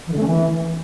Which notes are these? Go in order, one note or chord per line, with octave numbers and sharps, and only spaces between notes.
E3
D3
A3
C#4
E3